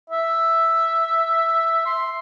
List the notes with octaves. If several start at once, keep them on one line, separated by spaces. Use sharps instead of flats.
E5
C6